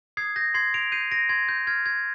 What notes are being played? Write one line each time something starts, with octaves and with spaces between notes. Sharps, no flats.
D#6 G#6 C7
G6 A#6
C6 G#6 C7
D7 F7
G6 C7 D#7
A#6 D7
C6 G#6
G6
F6 G#6
G#6